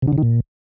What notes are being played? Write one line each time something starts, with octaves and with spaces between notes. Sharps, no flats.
C3
D3
C#3
D#3
A#2